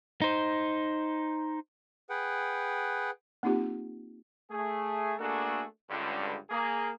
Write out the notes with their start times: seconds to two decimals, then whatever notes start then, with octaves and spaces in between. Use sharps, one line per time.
0.22 D#4 C5
2.10 G#4 B4 F#5 G5
3.43 A#3 C4 D#4 F4 G4
4.51 A3 G#4
5.19 A3 A#3 D4 F#4 G#4 A4
5.90 C#2 G2 D3
6.50 A#3 G#4